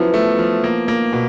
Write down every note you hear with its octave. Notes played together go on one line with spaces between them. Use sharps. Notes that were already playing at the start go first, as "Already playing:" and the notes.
Already playing: F3 F#3 B3 C#4 E4
A3
F3
A#3
A#3
B2